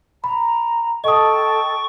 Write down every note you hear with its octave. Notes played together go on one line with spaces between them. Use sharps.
A#5 B5
A4 D#5 G5 A5 C#6 D#6